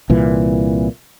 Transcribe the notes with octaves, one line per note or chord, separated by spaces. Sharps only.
C2 A#2 E3